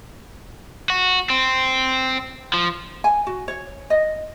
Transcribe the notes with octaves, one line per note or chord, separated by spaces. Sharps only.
F#4
C4
F3
G#5
F#4
C#5
D#5